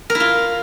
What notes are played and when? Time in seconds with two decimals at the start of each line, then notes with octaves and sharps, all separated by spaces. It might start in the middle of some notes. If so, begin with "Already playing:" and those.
0.10 A#4
0.15 E4
0.20 F4